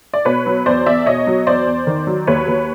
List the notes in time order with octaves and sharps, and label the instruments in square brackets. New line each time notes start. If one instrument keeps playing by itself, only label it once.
[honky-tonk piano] D5
B2 B4 C#5
F#3
E2 C5 D5
E2 D5 E5
B2 C#5 D#5
F#3
E2 C5 D5
E2
D#3
F#3
D#2 B4 C#5
D#2